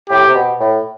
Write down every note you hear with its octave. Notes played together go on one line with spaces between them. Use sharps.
A2 G4
C3
B2
A2